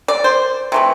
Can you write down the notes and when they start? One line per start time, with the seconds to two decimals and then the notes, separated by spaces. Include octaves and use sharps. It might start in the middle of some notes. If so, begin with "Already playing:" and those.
0.08 D5
0.24 C5
0.72 C3 E3 A3